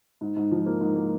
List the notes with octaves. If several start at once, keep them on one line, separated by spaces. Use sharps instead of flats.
G#2
G#2
F3
A#3
G#2
A#3